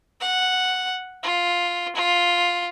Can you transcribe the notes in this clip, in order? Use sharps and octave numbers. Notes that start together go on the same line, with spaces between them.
F#5
F4
F4